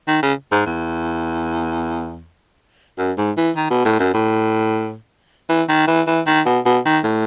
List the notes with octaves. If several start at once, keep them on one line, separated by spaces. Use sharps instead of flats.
D#3
C#3
G#2
E2
F#2
G#2
E3
D#3
B2
A2
F#2
A2
E3
D#3
E3
E3
D#3
B2
B2
D#3
A2